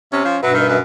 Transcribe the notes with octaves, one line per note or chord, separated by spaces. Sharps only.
C3 C#4
F3
G2 B2 F#3 B4 E5
D#3
F#2